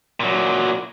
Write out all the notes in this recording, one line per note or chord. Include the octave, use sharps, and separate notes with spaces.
A#2 F#3